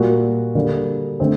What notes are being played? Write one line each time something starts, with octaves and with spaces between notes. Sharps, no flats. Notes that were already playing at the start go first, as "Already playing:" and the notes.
Already playing: A#2 G3 A#3 F#4
D3 G3 A#3
D3 A3 C4 D4